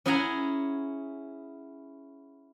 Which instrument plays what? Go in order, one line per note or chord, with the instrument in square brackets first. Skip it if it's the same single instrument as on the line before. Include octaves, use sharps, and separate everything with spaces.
[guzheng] C#4 E4 G#4 F#5 G#5 A#5